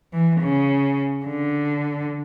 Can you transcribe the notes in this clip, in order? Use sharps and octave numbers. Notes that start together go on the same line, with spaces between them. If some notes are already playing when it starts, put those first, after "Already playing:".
E3
C#3
D3